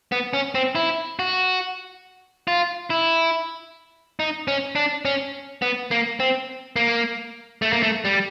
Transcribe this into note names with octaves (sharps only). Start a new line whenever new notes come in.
B3
C#4
C4
E4
F#4
F4
E4
D#4
C#4
D4
C#4
B3
A#3
C4
A#3
A3
A#3
A3
G3